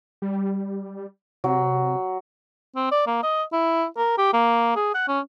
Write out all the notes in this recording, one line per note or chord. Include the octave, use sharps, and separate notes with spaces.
G3
C3 F#3
C4
D5
A#3
D#5
E4
A#4
G4
A#3
G#4
F#5
C#4